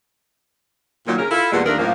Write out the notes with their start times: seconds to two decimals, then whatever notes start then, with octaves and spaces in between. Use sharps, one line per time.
1.06 A#2 D#3 F#3
1.18 C#3 A#4
1.30 E4 F4 A4
1.52 E2 A#2 G3 G#3 B3 F#5
1.65 D#2 F3 A3 D4 A#4
1.78 F#2 A2 F3 A#3